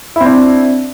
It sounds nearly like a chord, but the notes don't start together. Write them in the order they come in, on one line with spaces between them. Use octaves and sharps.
E4 C4 D4